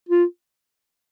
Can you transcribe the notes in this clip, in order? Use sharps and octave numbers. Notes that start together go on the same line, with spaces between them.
F4